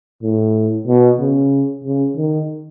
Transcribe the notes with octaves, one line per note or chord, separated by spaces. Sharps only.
A2
B2
C#3
C#3
D#3